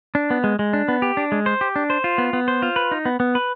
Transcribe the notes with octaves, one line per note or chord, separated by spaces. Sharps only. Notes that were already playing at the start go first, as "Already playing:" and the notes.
D4
B3
G#3
G#3
D4
B3
G4
D4
G#3
C5
G4
D4
C5
F4
B3
B3
C5
F4
B4
D#4
B3
B3
B4